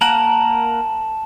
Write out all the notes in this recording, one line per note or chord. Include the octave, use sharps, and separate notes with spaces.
A#3 A#4 F#5 A5 E7